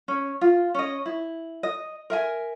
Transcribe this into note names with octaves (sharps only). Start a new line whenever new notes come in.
C#4
F4
C#4 D#5
E4
D#5
A#4 E5 G#5